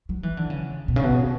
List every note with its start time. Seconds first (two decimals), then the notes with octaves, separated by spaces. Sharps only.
0.09 F#3
0.23 E3
0.37 D3
0.50 C#3
0.88 B2
0.96 C#3
1.04 B2